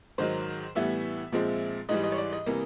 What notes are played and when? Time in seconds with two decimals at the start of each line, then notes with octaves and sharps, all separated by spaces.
0.18 G#2 D#3 F#3 C5
0.75 A2 E3 G3 B3 E5
1.32 A#2 F3 G#3 C4
1.89 G#2 E3 G3 D#5
2.04 D#5
2.12 C#5
2.18 D5
2.32 D#5
2.46 C3 E3 G3 A#3